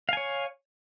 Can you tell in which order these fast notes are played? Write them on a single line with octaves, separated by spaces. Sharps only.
F5 G#5 C#5